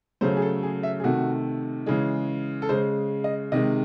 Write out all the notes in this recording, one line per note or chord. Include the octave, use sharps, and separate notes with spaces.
C#3 F#3 A3 C5
G#4
A4
G#4
E5
G#4
C3 D#3 A3 F#4
C#3 E3 G#3 G#4
A4
C#3 G#3 C5
D#5
C3 D#3 G#3 D#5